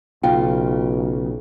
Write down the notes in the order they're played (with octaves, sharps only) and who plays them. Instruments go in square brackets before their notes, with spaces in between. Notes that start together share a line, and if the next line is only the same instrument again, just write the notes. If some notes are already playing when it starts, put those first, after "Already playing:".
[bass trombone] B1 [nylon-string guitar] C#3 F4 [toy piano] G5